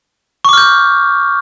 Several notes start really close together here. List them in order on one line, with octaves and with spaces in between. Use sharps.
C#6 D6 F6 G6